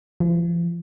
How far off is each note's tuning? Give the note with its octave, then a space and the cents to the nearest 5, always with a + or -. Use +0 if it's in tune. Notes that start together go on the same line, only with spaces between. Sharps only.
F3 -45